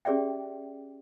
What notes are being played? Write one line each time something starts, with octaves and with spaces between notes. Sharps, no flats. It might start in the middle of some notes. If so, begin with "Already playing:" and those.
C#4 G4 G#4 D5 E5 G5